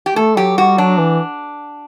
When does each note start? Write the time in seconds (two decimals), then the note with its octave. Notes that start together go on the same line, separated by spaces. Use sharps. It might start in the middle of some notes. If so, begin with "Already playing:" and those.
0.06 G4
0.15 A3 A4
0.37 F#3 G4
0.58 G3 F#4
0.78 F#3 D4
0.98 E3